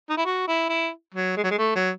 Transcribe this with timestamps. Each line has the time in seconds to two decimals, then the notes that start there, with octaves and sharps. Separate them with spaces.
0.09 D#4
0.17 E4
0.25 F#4
0.48 E4
0.69 E4
1.14 F#3
1.37 G#3
1.44 F#3
1.51 G#3
1.58 A3
1.75 F#3